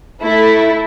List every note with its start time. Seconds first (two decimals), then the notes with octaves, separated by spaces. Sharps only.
0.21 A3 E4 A4